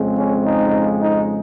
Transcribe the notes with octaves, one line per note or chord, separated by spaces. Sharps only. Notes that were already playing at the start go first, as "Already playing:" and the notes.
Already playing: F2 C#3 G#3 C4
C#4
D#4
D#4